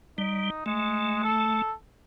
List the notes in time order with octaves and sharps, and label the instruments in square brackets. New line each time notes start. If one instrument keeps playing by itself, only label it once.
[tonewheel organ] G3 [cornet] D#4
[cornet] G#3 [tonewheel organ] A3
[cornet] A4